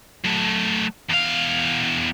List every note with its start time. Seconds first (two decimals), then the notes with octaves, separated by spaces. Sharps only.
0.24 F#3 A3
1.10 E2 F5